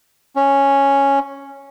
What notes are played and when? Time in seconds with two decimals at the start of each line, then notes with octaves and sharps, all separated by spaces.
0.36 C#4